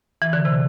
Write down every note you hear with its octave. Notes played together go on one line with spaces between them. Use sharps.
E3
D3
C3